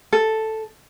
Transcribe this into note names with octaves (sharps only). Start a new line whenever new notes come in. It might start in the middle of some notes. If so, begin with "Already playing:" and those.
A4